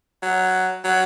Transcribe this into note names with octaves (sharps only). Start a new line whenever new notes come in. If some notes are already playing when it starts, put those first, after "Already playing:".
F#3
F#3